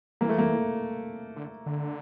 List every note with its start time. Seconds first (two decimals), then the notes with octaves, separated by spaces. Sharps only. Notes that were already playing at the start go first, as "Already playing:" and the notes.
0.21 E3 A#3
0.29 A3
0.38 A#3
1.36 D3
1.66 D3